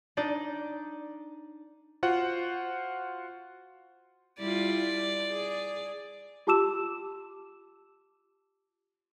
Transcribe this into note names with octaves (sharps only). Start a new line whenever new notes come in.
D4 D#4 D5
F4 F#4 C5 F#5
G3 E4 F4 D5
G#4
F4 G4 A5 D6 E6 E7